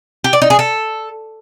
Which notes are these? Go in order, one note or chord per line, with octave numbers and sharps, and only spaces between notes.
G4
D5
D#4
G#4
A4